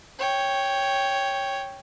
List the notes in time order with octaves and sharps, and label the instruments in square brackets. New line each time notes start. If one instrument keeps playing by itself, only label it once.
[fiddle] C#5 G5